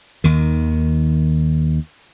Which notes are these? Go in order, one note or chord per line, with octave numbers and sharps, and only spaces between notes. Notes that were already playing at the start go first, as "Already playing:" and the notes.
D#2 D#3